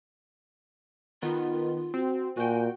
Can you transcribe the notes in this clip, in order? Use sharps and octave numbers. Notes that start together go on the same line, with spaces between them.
D#3 B3 F4
C4 F#4
A#2 F#4 G5 G#5